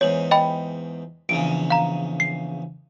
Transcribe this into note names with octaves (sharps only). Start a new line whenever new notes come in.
E2 G#2 C#5 F#7
D#5 G5 B5
A#1 E2 C#3 D7
F5 A#5
C7